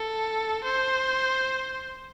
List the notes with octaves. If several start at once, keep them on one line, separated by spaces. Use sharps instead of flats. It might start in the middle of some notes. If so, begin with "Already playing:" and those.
Already playing: A4
C5